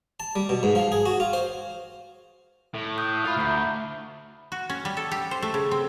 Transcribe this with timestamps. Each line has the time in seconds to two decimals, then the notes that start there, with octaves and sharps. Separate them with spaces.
0.20 A5
0.36 G3
0.49 B2
0.63 G#2
0.75 F3
0.92 G#4
1.06 F#4
1.20 F4
1.33 C5
2.74 A2
2.98 D#6 F#6 G6
3.25 F4 E5 F5 B5 F6
3.37 D2 A#5 G6
4.52 F#4
4.70 C#4
4.85 G3
4.97 A4
5.11 G4
5.31 C5
5.42 A3
5.54 C#3
5.71 C4